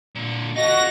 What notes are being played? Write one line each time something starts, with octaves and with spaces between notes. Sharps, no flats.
A#2 D3
F4 F#4 A4 D#5 A#6